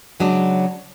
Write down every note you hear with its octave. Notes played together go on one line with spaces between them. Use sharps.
C#3 F#3 G#3 D4